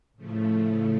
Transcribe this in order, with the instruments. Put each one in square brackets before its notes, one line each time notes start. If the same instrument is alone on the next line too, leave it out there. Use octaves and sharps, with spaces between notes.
[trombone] A2 [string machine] C#3 F3 A3